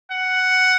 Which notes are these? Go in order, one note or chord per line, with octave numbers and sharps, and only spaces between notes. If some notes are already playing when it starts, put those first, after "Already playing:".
F#5